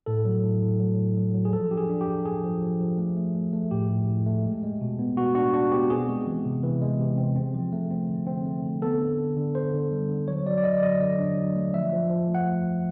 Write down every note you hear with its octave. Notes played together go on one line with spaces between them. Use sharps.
A2 A4
F#3
A2
A2
F#3
A2
F#3
F#3
G#4
F3 A4
D4 G4
G#4
D4
G4
D4
D4 G#4
F3
F3
F3
A3
A3
A3
A3
A2 G4
A2
A2
A3
G#3
G#3
B2
B3
B2 F#4
D4 F#4
D4 F#4
B3 G4
C4 G#4
G#3
E3
C3
E3
G#3
C3
C4
C4
F3
A3
C4
D3
C4
A3
D3
B3 A4
D3
D3
D3
D3 C5
D3
G3
D3
F#3 C#5
F#3 D5
D5
D3 D#5
D5
F#3 D#5
D3 D#5
D4
F#3
A3
F3 E5
F3
F3
A3
F#5